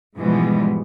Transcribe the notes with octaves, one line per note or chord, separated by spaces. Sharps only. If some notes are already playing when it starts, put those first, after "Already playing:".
G#2 B2 E3 F3 G3 G#3